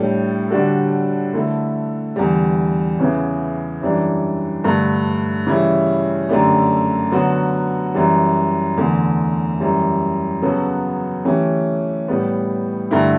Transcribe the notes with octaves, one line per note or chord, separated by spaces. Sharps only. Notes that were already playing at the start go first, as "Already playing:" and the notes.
Already playing: A2 G3 D4 A4
D3 G3 D4 F#4 A4
D3 A3 E4 A4
E2 D3 G3
E2 C#3 E3 B3
F#2 E3 G3 D4
G2 D3 A3
C#3 E3 G3 C#4 E4
F#2 D3 A3 D4 G4
D3 F#3 B3 F#4
F#2 E3 G3
E2 D3 A3
F#2 E3 G3
C#3 F#3 B3 F#4 A4
E3 A3 C#4 G4
A2 G3 B3
G2 D3 A3 E4 G4